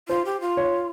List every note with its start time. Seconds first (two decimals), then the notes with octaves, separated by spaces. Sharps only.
0.08 F4 C5
0.25 G4
0.41 F4
0.57 C#5